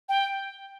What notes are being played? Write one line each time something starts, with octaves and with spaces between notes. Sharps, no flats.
G5